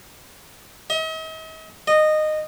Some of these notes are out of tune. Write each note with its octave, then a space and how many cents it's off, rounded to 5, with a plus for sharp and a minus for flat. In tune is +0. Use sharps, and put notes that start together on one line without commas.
D#5 +45
D#5 -15